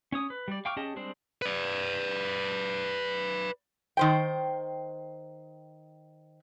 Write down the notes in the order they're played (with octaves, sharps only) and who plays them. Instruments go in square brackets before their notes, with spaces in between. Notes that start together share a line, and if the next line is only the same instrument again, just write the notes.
[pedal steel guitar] C#4 C#5 D#6
B4
G3 D5
F5 G5 C#6 D6 F6
C#4 G4 G#4 D#5 A5
G3 G#3 C4 D4 C5
[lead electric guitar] B4 D5
[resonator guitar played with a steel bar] D#3 C5 G5